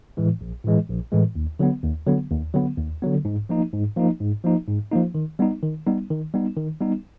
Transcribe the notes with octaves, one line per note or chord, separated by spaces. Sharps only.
A2 E3 G#3
A#1
A2 E3 G#3
A#1
A2 E3 G#3
D#2
D3 F#3 B3
D#2
D3 F#3 B3
D#2
D3 F#3 B3
D#2
D3 F#3 B3
G#2
F3 A#3 D#4
G#2
F3 A#3 D#4
G#2
F3 A#3 D#4
G#2
F3 A#3 D#4
D#3
G3 B3 D#4
D#3
G3 B3 D#4
D#3
G3 B3 D#4
D#3
G3 B3 D#4